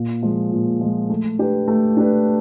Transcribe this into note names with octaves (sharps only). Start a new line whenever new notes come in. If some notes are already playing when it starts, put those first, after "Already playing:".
Already playing: A#2
F3 G#3
A#2
F3 G#3
A3
D4 G4 B4
A3
D4 G4 B4